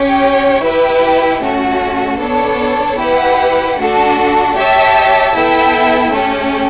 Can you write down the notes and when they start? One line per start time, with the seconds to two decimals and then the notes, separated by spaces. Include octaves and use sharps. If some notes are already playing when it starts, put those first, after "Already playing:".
Already playing: C#4 G4 C#5 G5
0.63 E4 G4 B4 E5 G5
1.41 A3 C#4 F#4
2.19 B3 D4 A4 C#5
2.99 E4 G4 B4 F#5
3.77 A3 D4 F#4 A4
4.55 G4 C#5 E5 A5
5.35 B3 E4 A4 E5 G5
6.14 A3 C#4 G4